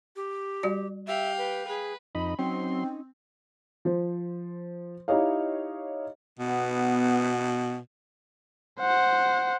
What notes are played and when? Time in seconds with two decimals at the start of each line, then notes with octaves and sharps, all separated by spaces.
0.16 G4
0.63 G3 F#4 D5
1.07 G4 E5 F5 G5
1.38 B4
1.69 G#4 B4
2.15 F2 D#4 D#5 B5
2.39 F#3 C4 C#4 D#4 C6
3.85 F3 C5
5.08 D#4 E4 G4 C#5 D#5 F5
6.39 B2 B3
8.80 C5 F#5